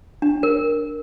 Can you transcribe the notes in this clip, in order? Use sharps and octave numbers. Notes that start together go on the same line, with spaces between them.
D4
A#4